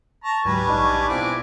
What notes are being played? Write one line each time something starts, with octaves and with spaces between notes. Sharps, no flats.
A5 A#5 C#6
D2 G#2 F#3 G3 B4 G#5
A#1 D4 D#4 G4
B2 E3 C4 F4 D6